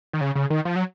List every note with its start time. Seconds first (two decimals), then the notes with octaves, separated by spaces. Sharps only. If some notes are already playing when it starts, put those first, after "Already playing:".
0.13 D#3
0.21 C#3
0.35 C#3
0.50 D#3
0.65 F3
0.76 F#3